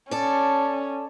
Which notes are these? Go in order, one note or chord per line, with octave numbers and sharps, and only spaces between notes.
C#4 A4 D5